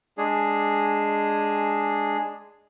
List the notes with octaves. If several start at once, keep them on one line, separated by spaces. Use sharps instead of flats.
G#3 D4 G#4